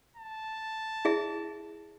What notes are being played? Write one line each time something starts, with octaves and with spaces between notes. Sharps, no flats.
A5
E4 G#4 E5